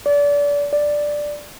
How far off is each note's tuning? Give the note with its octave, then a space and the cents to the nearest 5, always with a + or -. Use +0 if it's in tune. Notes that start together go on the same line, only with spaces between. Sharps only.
D5 -30
D5 +5